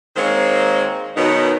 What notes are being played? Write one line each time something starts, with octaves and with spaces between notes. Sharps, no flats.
D#3 G#3 A#3 C4 C5 C#5
B2 D#3 F#3 B3 D#4